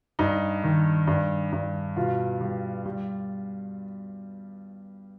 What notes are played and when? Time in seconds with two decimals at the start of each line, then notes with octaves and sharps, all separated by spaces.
0.19 G2 D#4
0.64 D#3
1.07 G2
1.52 G2
1.97 B2 F4
2.41 G3
2.86 G3